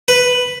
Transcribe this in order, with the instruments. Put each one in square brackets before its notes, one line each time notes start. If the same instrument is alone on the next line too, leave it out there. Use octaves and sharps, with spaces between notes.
[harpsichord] B4